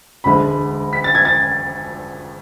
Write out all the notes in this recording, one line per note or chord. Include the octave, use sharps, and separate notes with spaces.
E1 D2 D3 G#3 B5
B6
A6
G#6
A6